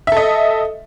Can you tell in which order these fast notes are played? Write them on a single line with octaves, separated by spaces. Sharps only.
E5 A4 D#5